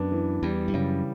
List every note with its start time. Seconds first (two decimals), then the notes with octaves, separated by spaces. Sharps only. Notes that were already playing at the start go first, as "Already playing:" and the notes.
Already playing: F#2 B3 D4
0.12 E3
0.43 E2 G3
0.68 G2
0.74 F#2 C#3